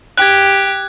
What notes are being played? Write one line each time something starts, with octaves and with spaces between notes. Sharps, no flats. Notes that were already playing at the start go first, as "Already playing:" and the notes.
G4 F#6 G#6